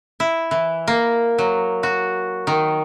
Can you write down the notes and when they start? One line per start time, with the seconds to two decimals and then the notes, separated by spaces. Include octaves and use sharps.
0.20 E4
0.51 E3
0.88 A#3
1.38 F#3
1.83 F#4
2.47 D#3